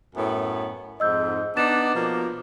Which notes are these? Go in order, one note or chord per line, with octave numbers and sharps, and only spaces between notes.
F#2 A2 B3
F2 G#2 D#5 E6 G6
B3 D4 D#4 D6 A6 E7
B2 F3 A#3